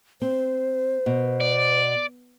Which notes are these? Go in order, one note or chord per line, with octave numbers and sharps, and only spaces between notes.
C4 C5
B2
D5